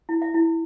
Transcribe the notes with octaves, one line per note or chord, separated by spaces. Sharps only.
E4
E5
E4